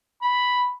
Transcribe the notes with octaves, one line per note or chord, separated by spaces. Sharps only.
B5